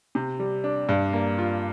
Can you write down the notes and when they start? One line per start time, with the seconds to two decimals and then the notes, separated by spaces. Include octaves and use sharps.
0.15 C3
0.39 G3
0.64 D4
0.89 G2
1.13 A#3
1.38 F4